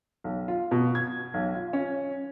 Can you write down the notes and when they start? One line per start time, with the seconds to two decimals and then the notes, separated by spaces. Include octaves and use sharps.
0.24 B1
0.48 F4
0.71 B2
0.95 G#6
1.34 B1
1.55 F4
1.73 C#4